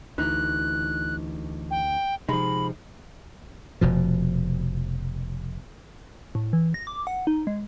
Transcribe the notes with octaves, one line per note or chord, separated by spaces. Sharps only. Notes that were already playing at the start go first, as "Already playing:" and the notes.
D2 E3 D#4 F#6
G5
C3 F3 G#3 D#4 B5
F1 B2 F3
A2
E3
A#6
D6
F#5
D#4
G#3